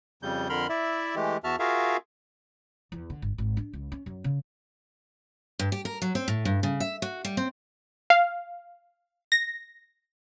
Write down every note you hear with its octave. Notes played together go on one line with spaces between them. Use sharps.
F2 C#3 G3 G6
F2 D3 A#4 B5 C6 F6
E4 D5 E5
E3 G#3 A3 G4
E2 F#4 E5 A5 F6
F4 F#4 G#4 A#4 E5 F5
E2
D3
G1
G#1
D4
C#2
C#4
F#2
C#3
G2
G4
A#4
F#3
C4
A2
G2
C#3
E5
F#4
G3
C4
F5
A#6